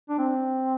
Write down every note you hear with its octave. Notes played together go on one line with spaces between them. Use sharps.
D4
C4